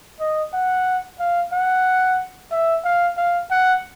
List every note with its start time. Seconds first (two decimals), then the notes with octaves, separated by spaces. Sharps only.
0.20 D#5
0.54 F#5
1.20 F5
1.53 F#5
2.52 E5
2.85 F5
3.18 F5
3.51 F#5